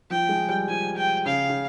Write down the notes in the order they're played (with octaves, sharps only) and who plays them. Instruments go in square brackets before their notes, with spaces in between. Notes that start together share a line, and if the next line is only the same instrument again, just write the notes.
[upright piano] F3 [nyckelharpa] G5
[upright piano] G#3
G3
[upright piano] F3 [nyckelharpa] G#5
[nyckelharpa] G5
[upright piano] C#3 [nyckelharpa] F5
[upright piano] C#3